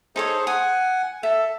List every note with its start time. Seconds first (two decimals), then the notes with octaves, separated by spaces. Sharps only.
0.16 D#4 G#4 A4 C5 C#5
0.47 F#5 G#5 D#6
1.23 A4 E5